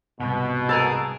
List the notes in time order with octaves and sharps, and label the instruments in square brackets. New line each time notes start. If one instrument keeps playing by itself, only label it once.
[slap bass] C2 G#2 [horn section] B2
[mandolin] G#4 A#4 A5 [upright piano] E6